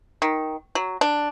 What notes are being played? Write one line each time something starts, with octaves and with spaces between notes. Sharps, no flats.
D#3
F#3
D4